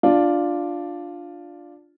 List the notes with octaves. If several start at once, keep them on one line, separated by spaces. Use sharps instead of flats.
D4 F4 D5